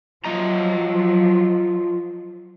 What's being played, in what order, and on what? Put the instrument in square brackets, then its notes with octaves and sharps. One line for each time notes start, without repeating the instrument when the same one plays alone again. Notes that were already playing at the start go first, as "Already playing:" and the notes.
[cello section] F3 F#3 [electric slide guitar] F4 D#5 A#5